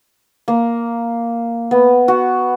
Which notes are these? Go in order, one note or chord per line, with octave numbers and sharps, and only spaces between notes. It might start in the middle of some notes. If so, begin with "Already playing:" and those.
A#3
B3
F#4